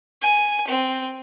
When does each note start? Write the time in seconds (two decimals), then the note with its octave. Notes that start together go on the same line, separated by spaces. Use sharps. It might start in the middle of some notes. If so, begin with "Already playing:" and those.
0.22 G#5
0.68 C4